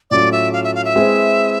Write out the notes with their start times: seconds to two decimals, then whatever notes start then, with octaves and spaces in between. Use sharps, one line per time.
0.10 A2 F#3 A3 C#4 F4 D5
0.32 E5
0.53 F5
0.64 E5
0.75 F5
0.85 E5
0.95 G#3 C4 E4 G#4 B4